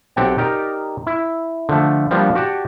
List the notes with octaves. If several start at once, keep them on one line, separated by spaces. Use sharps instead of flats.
B1 C4 G4 F#5 G5 A5
D#4 G4 A#4 D5
E4
D3 F3 A3
F3 G3 A#3 B3 D4
F#4 G4 D5 F#5 A5